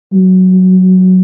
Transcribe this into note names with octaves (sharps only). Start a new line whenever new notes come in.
F#3